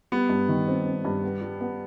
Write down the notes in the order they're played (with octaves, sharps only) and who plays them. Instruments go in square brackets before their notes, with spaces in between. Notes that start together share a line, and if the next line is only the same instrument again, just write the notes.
[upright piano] G3 [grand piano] B3
[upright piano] G2
D#3
C4
C4
G2
B3
G3
B3